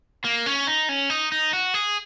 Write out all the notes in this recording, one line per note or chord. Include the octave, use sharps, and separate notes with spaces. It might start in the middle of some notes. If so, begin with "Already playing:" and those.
A#3
C#4
D#4
C#4
D#4
D#4
F#4
G#4